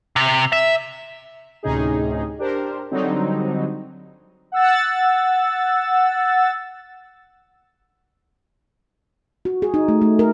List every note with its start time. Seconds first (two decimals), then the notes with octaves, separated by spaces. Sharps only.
0.16 C3
0.52 E5
1.63 D2 A2 C3 C#4 D#4 G#4
2.39 D4 G4 A#4 C5
2.91 D3 F#3 G3 C4 D#4
4.52 F#5 E6 A6
9.45 F#4
9.62 G#4
9.74 D#4
9.88 A3
10.02 A3
10.19 A#4